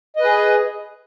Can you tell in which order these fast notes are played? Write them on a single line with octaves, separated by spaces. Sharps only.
D#5 B4 G#4